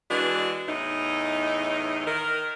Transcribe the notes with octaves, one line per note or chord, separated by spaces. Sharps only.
E3 G#3 D4 F#4
E2 A2 D#4
D#3 A#4